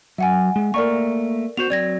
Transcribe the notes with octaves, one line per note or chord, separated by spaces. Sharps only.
F#3 E5 F#5 G#5
G#3
A3 A#3 A#4 D5 A#5 C#6
B3 F#4 C5 F7
F#3 C4 D5 G#6 A#6